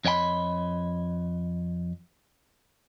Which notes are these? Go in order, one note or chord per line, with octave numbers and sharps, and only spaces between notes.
F2 C#5 D#5 G5 B5 C6